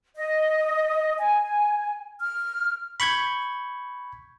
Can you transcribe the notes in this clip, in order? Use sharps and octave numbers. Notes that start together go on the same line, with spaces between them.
D#5
G#5
F6
B5 C#6 G6 G#6